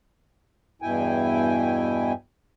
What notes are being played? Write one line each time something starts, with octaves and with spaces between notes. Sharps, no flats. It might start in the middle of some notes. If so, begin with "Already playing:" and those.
E2 G2 B2 E4 G5 G#5